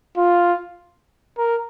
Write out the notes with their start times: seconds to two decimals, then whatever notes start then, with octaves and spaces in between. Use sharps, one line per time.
0.17 F4
1.38 A#4